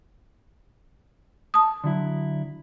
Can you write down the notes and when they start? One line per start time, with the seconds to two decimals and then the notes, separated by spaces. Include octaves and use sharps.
1.54 A5 D#6
1.84 D3 F#3 E4